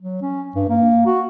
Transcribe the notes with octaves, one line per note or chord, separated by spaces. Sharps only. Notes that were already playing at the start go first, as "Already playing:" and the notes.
F#3
C#4
G2
A#3
F#4